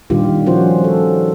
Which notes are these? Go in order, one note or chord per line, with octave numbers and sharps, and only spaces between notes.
A#2 D#3 G3 D4 F4 G4
F3 C#4 F#4 C5
A4